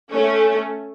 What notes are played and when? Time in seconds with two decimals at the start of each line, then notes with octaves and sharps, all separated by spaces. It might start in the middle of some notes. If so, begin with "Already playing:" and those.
0.12 A3 C#4